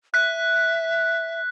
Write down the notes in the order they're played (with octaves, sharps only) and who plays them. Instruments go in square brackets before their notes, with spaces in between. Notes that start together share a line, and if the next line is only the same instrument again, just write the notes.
[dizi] E5 [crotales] F#6 B6